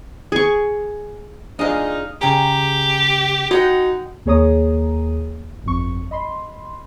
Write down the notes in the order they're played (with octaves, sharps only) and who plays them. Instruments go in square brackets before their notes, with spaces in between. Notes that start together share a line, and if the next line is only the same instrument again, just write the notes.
[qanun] G#4 C#6
[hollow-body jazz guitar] D4 F4 G#4 [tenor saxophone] D#4 [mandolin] D#5 F5
[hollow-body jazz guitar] C#3 G#4 [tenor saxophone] G4 [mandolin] G5 A#5
[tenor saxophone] D#4 [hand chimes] F#4 [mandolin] D#5 F#5 G5
[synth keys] D#2 A#3 G#4 C#5 A#5 D#6
G1 F2 C#6
D#5 B5 C6